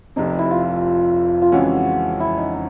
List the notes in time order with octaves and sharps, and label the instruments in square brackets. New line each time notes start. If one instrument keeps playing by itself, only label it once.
[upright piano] F1 F2 C3 [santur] D#4
[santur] E4
F4
F4
[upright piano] F2 C#3 E3 G#3 C#4 [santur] F#4
[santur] E4
D#4
D#4